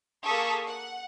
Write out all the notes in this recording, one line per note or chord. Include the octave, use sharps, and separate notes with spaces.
A#3 G#4 A4 C#6 D#6 B6
F#5